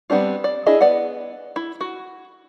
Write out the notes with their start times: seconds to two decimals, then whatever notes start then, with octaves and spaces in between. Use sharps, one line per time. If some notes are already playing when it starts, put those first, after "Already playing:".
0.10 G3 B3 C4 D4 F4
0.44 D5
0.66 D4 E4 G#4 D#5 G#5
0.81 B3 D5 F#5
1.56 E4
1.81 F#4